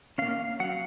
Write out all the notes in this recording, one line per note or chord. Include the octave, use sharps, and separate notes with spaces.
A#3 C#4 F5
F#3 F#5